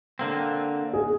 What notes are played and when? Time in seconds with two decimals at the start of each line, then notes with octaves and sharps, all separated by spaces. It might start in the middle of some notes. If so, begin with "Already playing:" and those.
0.19 D3 A#3 C4
0.93 G#4